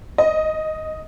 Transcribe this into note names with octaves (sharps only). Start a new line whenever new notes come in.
D#5